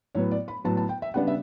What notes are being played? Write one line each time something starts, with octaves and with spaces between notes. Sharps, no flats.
A2 F#3 B3 C#5
D5
B5
A2 F#3 B3 A5
A5
G5
E5
C#3 G3 B3 D4 F#5
E5